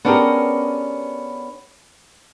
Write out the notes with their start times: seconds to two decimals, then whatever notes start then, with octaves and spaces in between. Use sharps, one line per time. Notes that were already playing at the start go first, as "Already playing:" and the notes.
0.05 B3 C#4 D4 G4 G#4 A#4